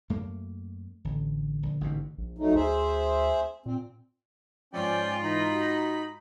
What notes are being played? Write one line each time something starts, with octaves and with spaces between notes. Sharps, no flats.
F#2 A3 A#3
A1 D3
A#1
A1 G#2 B2
A#1
F#3 A3 D#4
D2 G#4 C5 E5
A#2 C4
G#2 F3 C#4 F4 D5 G5
E3 D#4 B5
F#4